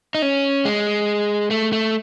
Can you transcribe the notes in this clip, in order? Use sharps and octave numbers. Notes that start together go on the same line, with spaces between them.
D#4
C#4
G#3
A3
A3